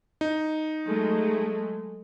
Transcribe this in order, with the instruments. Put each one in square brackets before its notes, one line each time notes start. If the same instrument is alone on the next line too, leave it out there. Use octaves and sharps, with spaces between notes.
[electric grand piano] D#4
[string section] F#3 G#3 A3